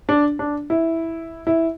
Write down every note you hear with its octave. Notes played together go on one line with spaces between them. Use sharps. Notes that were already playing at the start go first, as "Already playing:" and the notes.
D4
D4
E4
E4